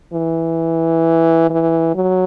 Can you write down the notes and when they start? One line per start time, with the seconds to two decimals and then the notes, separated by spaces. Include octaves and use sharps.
0.13 E3
1.50 E3
1.95 F#3